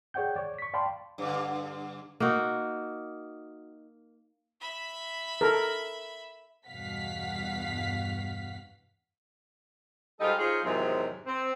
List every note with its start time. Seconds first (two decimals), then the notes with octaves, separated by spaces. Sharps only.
0.14 G#4 C#5 D5 F#5 G5 G6
0.36 C#5 D5
0.59 C#6 B6
0.74 D5 F5 G5 A5 B5 C6
1.18 G2 D3
2.20 A#3 D#4 F#4
4.61 E5 B5
5.41 A4 A#4
6.68 E2 G2 B2 F5 F#5 B6
10.20 G#2 G3 D#4 F4 A4 D#5
10.38 D#4 F4 G#4 C5 C#5
10.63 E2 G#2 C3 D#3 F#3
11.26 C4